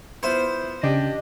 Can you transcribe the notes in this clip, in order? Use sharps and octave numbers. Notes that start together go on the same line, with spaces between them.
B3 E4 F4 C5
C#3 D4 G4 D#5